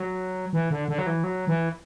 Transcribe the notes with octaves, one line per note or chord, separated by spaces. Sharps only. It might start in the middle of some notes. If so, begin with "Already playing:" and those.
Already playing: F#3
E3
D3
D3
F#3
E3
F#3
E3